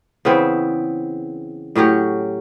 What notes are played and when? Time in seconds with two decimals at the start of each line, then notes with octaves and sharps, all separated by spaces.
0.25 C#3 E3 B3 C4
1.75 A2 F#3 C#4 G4